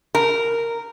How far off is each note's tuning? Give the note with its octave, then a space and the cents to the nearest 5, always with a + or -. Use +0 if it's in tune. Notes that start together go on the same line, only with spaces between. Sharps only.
A#4 -10